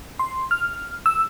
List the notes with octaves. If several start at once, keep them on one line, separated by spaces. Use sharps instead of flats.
C6
F6
E6